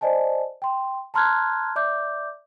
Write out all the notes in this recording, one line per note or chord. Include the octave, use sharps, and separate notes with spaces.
C5 D5 D#5 G#5 A5
G5 C6
A5 A#5 C6 F6 F#6 G#6
D5 E5 D6 G6